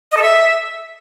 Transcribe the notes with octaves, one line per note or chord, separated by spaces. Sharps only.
D#5
A4
E5